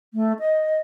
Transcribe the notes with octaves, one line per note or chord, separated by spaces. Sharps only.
A3
D#5